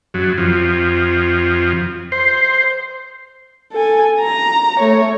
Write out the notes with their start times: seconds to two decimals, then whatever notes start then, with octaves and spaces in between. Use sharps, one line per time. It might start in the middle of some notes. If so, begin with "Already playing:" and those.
0.14 F#2
0.38 F2
2.12 C5
3.72 A4 G#5
4.20 A#5
4.79 A3 C#5